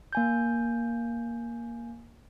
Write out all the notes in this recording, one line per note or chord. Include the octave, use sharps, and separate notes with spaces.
A#3 G#5 G6